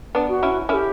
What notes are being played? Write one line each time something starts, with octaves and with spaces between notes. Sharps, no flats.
B3 D4
F#4
C#4 E4
C#4 E4 G4 A#4